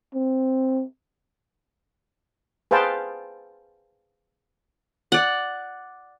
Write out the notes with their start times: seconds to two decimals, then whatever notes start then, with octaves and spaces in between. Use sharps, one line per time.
0.14 C4
2.71 G#4 B4 C5 F5 G5 A5
5.12 D5 F#5